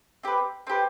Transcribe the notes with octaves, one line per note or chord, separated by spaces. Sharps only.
C4 G4 B4
C4 G4 B4